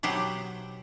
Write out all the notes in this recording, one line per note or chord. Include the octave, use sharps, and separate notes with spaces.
B2 F#3 G4 C5 F#5